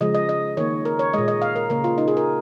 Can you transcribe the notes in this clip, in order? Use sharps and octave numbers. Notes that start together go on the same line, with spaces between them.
C#3 F3 G#3 D#5
D#5
D#5
D#3 A#3 C#5
A#4
C#5
A#2 G#3 D#5
D#5
F5
A#4
C#3 A#3 A#4
F4
D#4
G#4
A#4